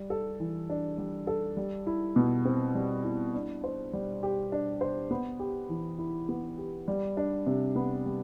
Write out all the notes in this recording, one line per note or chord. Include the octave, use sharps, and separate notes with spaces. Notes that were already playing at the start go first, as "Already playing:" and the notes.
Already playing: G3
A4
E3
D4
G3
A4
G3
E4
B2
C4
G3
E4
D4
C5
G3
G4
D4
C5
B3
G4
E3
E4
B3
G4
G3
D4
C3
B3
G3